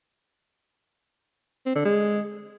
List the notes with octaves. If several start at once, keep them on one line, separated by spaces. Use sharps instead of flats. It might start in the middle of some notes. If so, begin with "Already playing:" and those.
C4
D3
G#3